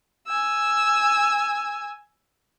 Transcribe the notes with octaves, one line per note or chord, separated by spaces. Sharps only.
G#5 E6